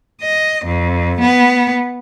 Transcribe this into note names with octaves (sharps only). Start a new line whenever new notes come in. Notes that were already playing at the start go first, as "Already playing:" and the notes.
D#5
F2
B3